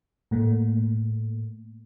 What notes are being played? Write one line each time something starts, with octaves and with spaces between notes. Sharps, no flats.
A2 A3 A#3